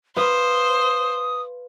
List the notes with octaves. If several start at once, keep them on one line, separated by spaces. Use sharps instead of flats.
B4 C5 F5 D#6